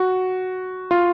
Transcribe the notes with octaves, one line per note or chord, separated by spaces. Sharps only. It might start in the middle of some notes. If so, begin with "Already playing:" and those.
Already playing: F#4
F4